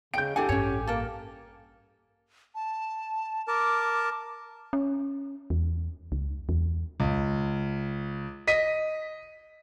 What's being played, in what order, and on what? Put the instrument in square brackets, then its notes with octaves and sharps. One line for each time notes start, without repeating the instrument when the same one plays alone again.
[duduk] C#3 [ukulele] D#5 G5 [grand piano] G6 D7
[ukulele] D4 E4 F#5 [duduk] G4 [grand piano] A4 G#5
[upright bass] A1 G2 [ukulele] C#4 C#5
[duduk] A#3 [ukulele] A4 A#4
[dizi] A5
[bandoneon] A#4 A5 [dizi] D6
[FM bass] C#4
E2
C#2
E2
[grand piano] C#2
D#5 B6 D#7